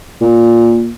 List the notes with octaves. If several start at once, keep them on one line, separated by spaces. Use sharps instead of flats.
A#2